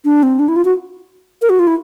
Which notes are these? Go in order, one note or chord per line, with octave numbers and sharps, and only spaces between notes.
D4
C4
D4
E4
F4
F#4
A#4
F#4
F4
E4